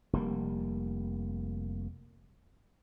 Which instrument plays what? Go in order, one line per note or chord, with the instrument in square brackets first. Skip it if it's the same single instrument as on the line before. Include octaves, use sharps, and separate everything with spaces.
[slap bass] F1 G3 A#3